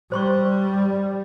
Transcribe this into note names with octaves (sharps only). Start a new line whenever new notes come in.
G3 C5 C6 C#6